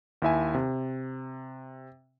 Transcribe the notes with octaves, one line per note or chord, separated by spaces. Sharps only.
D#2 E4 E5 G#5
C3